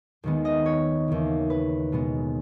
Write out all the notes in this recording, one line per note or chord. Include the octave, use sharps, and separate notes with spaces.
D#2 D#3 G#3 B3
D#5
C#5
D#2 C#3 E3
B4
B2 G#3 B3